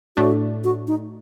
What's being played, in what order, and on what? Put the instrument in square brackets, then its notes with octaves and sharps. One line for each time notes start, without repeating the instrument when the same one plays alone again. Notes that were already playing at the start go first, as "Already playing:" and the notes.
[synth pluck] A2 A3 D4 [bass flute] F#4
[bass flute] F#4
D#4